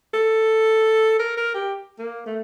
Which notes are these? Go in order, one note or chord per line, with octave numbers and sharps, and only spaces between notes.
A4
A#4
A#4
G4
A#3
A3